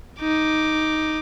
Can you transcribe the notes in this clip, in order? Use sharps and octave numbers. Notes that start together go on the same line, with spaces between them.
D#4 D6